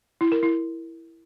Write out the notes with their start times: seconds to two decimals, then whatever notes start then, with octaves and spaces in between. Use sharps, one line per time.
0.21 E4
0.32 A#4
0.43 E4